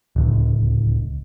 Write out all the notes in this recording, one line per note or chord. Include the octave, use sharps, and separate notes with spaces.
D1 C#2